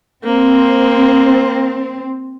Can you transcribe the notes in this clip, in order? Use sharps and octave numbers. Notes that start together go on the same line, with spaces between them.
A#3 C4